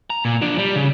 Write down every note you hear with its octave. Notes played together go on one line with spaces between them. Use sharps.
A#5
A#2
F3 D4
G3
C#3